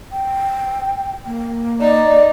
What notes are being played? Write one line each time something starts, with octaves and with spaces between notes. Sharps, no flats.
G5
A#3
D#4 D5